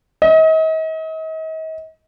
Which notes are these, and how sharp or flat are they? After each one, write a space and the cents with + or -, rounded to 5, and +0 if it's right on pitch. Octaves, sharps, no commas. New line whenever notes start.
D#5 +40